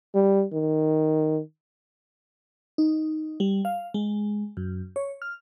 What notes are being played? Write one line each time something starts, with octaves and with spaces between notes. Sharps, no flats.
G3
D#3
D#4
G3
F5
G#3
F#2
C#5
F6